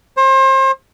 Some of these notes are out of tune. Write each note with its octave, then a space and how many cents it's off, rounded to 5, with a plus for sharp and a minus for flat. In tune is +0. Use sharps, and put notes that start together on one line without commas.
C5 +35